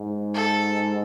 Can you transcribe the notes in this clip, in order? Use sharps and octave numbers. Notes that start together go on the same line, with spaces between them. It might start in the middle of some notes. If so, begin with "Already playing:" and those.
Already playing: G#2
A4